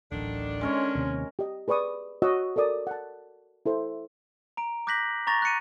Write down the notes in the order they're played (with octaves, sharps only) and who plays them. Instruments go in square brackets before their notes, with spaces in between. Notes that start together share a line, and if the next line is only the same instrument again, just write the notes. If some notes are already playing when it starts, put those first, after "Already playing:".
[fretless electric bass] D1 A1 [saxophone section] D3 D#3 D4
[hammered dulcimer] G#3 A#4 C#5 [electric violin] C#4
[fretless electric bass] D#2 C3
[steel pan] G4 D#5
G#4 B4 D5 C#6 D#6
F#4 C#5 D#5 F#5 E6
A4 A#4 D5 D#6
F#5 A5
E4 A4 C5
[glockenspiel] A#5 D7
D6 F#6 G6 A#6 B6 F#7
A#5 C#6 A6 A#6 F7
F#6 A6 C#7 D#7